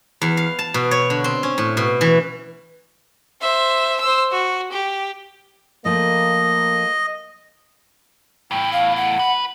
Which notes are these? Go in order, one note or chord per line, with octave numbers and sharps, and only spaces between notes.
E2
F5
A5
B2
C#5
D3
C4
C#4
A2
B2
E3
C5 E5
C5 E6
F#4
G4
F3 A3 A#3 D#5
E2 A2 G5
F5
F#5
B4